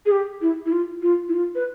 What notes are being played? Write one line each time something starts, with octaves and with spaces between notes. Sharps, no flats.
G#4
G4
E4
E4
F4
F4
E4
F4
B4